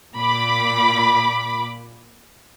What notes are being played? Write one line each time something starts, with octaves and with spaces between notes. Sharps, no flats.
A#2 B5 D6